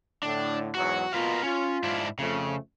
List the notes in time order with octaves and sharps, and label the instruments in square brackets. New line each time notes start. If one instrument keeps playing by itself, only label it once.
[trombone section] A2 D3 [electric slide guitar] D4
[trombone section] E2 G#2 F#3 [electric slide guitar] F#4
[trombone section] B2 F4 [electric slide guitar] A#4 B4 F5
[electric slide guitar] C#4 [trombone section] F4
[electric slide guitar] G#2 D4 E4
[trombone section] F2 A3 [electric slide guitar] C#3